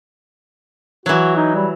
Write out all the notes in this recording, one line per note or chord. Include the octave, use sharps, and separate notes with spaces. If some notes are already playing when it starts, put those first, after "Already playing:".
E3 F#3 F#4
D#4
G3